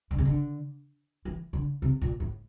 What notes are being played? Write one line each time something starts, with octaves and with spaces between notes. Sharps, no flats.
D3
C3
D3
E3
D3
C3
A#2
A2